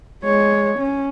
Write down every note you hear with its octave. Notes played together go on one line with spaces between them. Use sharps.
G#3 C#5
C#4